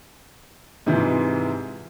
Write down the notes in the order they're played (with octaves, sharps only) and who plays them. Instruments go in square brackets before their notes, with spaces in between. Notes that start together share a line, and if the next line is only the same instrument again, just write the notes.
[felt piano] G#2 C3 E3 F3